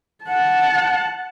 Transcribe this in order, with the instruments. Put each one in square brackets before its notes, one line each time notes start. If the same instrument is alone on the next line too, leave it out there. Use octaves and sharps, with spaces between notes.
[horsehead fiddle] F#5 A5